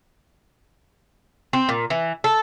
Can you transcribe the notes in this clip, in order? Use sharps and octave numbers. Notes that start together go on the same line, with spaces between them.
C4
A#2
E3
A4